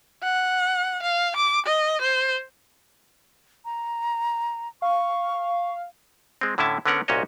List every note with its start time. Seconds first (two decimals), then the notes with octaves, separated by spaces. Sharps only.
0.22 F#5
1.02 F5
1.36 D6
1.66 D#5
2.01 C5
3.65 A#5
4.82 F5 C#6
6.41 G#3 C4
6.58 A2 D3 C#4 E4 E5 A5
6.86 D3 B3 C#4 A#4 F#5
7.08 C2 A#2 C#4 F#4 C#5 D#5